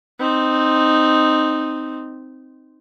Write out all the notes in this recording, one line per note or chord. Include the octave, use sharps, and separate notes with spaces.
C4 D#4